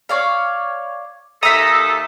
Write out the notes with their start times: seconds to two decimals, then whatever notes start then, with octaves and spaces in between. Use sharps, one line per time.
0.09 C#5 D5 F5
1.43 D#2 A4 E5 A#5 D#6 B6